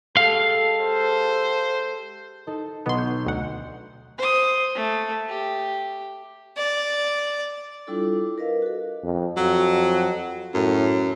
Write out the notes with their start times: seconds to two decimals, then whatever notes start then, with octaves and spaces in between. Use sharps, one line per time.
0.17 G#3 G4 A4 F5
0.81 C5
2.47 D#4 A4
2.86 B1 B3 D#5 C6
2.98 G6
3.26 D2 F#5
4.18 C5 D#6
4.75 A3
5.28 G4
6.57 D5
7.87 G3 D4 E4 F4 A4
8.38 A#4 B4 D#5 F5
8.62 F#4 A4
9.04 F2
9.37 F2 F#3
10.54 F#2 A2